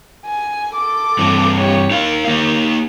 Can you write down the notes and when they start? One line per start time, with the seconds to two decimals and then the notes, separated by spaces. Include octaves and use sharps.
0.25 G#5
0.74 A4 D6
1.19 G2 E3 C4
1.56 G4 C#5
1.91 D#4 A#4 F5
2.27 A#3 D#4 G4